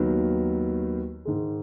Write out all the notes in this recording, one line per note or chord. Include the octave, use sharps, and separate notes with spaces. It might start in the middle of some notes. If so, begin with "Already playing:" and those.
Already playing: D#2 D#3 F#3 B3
G#2 D#3 G#3